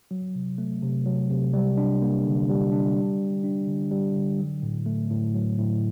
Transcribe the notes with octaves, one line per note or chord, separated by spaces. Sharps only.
F#3
C3
A3
C3
F#3
C3
G3
D4
A#3
D3
G3
D4
G3
D3
D4
D3
G3
D3
F#3
A2
A3
A2
F#3
A2